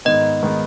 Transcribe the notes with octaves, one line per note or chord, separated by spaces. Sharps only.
G#2 D#3 G#3 B3 D#5
D#3 G#3 B3